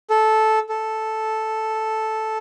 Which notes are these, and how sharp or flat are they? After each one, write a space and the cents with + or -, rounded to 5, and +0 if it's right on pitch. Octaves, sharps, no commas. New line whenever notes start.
A4 -10
A4 -5